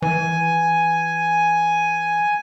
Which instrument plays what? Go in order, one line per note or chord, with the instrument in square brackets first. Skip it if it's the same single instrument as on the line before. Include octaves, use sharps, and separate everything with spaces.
[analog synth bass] E3 [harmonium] G#5